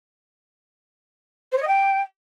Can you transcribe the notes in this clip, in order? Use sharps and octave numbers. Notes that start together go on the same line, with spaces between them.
C5
C#5
D#5
G5